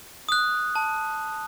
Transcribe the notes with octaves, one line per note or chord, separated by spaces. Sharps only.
D#6 F#6
A5